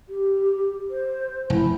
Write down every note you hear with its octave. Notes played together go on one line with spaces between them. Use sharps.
G4
C5
F1 E4